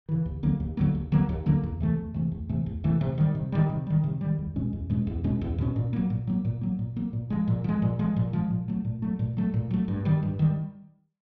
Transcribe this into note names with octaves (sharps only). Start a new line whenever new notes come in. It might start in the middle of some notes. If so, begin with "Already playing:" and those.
C#3 E3
D#2
D3 F#3 A#3
D#2
D3 F#3 A#3
D#2
D3 F#3 A#3
D#2
D3 F#3 A#3
E2
C3 E3 A3
E2
C3 E3 A3
E2
C3 E3 A3
E2
C3 E3 A3
C3
D#3 G3
C3
D#3 G3
C3
D#3 G3
C3
D#3 G3
E2
B2 G#3 C#4
E2
B2 G#3 C#4
E2
B2 G#3 C#4
E2
B2 G#3 C#4
A#2
F#3 A#3
A#2
F#3 A#3
A#2
F#3 A#3
A#2
F#3 A#3
A#2
F3 G#3
A#2
F3 G#3
A#2
F3 G#3
A#2
F3 G#3
A#2
F#3 A3
A#2
F#3 A3
A#2
F#3 A3
A#2
F#3 A3
G2
D#3 G3
G2
D#3 G3